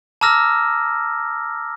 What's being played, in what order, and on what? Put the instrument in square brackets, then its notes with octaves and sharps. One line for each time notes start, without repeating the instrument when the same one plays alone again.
[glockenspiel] A5 A#5 D6 E6 F6 A#6